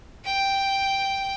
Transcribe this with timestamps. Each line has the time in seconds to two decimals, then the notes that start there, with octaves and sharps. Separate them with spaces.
0.25 G5